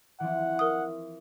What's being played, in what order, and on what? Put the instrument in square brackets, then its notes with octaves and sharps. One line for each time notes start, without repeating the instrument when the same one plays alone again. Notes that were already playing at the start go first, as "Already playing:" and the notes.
[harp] E3 F3 C4 [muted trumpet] F#5
[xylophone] A#4 D#6